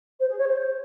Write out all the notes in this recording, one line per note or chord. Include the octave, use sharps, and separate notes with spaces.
C5
G#4
C#5
C5